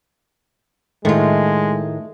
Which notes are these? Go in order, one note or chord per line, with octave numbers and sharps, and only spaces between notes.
A2 D#3 G#3 A3 F4